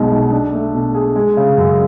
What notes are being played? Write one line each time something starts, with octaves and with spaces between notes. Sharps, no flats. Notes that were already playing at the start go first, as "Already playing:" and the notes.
Already playing: B1 B2 G#3
B1
D4
A3
B2
G#4
G#3
C#3
F#2